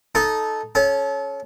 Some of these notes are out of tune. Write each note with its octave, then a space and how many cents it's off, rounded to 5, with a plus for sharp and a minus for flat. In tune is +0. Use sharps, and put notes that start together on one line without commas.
D#4 +0 A4 -15
C#4 +0 A4 -35